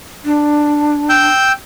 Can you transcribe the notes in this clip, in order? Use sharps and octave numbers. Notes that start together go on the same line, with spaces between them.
D4
G5 E6 G6